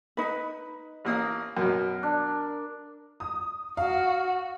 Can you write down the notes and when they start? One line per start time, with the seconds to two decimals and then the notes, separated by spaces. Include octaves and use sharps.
0.17 D#4 B4
1.05 A1 A#3 D#6
1.57 F#2 B2 A#4
2.03 D4
3.20 D#6
3.77 F#4 F5